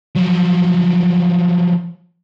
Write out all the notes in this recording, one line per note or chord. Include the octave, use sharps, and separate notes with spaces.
F3 F#3